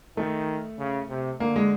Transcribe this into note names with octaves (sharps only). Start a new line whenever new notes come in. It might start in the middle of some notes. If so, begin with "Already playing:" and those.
D#3 A3
C#3
C3
D3 A#3
G#3